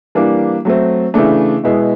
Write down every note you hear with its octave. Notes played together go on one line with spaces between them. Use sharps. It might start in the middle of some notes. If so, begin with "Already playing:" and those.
E3 G3 A#3 D4
F#3 A3 C4
C#3 E3 A3 D4
B2 G#3 B3 E4